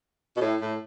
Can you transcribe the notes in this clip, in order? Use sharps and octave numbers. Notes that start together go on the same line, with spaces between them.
B2
A2
A2